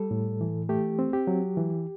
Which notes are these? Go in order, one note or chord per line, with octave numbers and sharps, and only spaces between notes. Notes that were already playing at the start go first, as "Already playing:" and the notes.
Already playing: G3 A4
A2
E3
A3 G4
C4
G4
F#3
E3